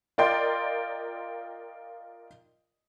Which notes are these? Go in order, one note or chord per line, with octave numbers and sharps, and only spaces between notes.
F4 A#4 D5 D#5 G5 C6